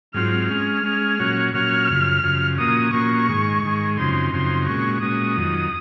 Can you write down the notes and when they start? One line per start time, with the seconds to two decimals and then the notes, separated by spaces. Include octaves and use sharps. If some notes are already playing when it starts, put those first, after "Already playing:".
0.14 G#2 F#3 C4 F4 F6
0.49 G#3 C#4 G#4 F6
0.84 G#3 C#4 G#4
1.19 A#2 F#3 C#4 F#4 C#5
1.54 A#2 F#3 C#4 F#4 C#5 F6
1.89 F#2 C#3 F3
2.24 F#2 C#3 F3
2.58 A#2 F3 A#3 C#4 F#4 D#6
2.93 A#2 F3 A#3 C#4 F#4 C#6
3.28 G#2 D#3 G#3
3.63 G#2 D#3 G#3
3.98 F#2 C#3 F3 C4 D#4 C6
4.32 F#2 C#3 F3 C4 D#4 C6
4.67 A#2 G#3 C#4 F#4 C#6
5.02 A#2 G#3 C#4 F#4 D#6
5.37 F2 D#3 F#3